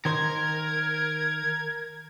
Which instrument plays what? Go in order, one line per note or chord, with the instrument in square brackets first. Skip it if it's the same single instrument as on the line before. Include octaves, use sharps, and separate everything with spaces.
[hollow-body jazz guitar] D#3 C5 [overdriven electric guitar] A#4 [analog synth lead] G#6